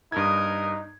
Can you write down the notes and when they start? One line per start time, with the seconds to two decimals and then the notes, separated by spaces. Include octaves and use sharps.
0.12 G2 D#4 A#4 D#6 G#6